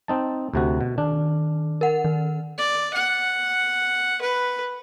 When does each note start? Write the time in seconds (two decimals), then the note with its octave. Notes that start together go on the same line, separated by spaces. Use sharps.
0.08 C4 D#4 A5
0.54 D2 C3 F#4
0.81 B2
0.98 D#3 D4
1.81 A#4 F#5
2.05 D#3
2.58 D5
2.94 F#5
4.21 B4